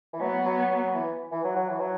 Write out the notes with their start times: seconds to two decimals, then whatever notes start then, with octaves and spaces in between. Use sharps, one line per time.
0.13 E3
0.20 F#3 B3
0.46 F#3
0.71 F#3
0.94 E3
1.32 E3
1.44 F#3
1.56 F#3
1.69 E3
1.80 F#3